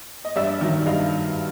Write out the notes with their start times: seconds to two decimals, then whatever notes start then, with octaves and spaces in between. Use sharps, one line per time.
0.25 D#5
0.36 G2 D5 E5
0.61 D#3 F#3
0.86 G2 D#5 F5